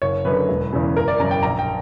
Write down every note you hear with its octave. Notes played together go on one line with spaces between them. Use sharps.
F#1 C#5
F#2 D3 B4
E1
E2 C#3
F#1 A#4
D5
F#2 C#3 A#5
G5
A#1 A#5
G5